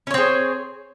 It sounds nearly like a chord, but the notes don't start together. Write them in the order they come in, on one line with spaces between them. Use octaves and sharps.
C#4 C#5 C4 G#4